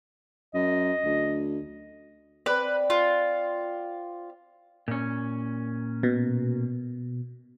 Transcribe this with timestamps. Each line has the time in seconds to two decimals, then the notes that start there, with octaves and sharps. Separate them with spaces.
0.54 F#2 D#5
1.05 D2
2.46 C4 B4 D5
2.90 F4
4.88 A#2 C#4
6.03 B2